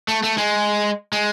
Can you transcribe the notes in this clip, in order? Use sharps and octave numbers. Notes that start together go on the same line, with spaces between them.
A3
A3
G#3
G#3